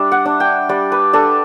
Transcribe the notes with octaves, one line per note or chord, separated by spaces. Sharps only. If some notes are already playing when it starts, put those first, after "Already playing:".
Already playing: G3 D4 D5 E5
F#5
D4
G5
G3 D5
B4
D4 A4